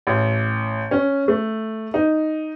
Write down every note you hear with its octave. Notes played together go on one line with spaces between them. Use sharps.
A1
C#4
A3
D#4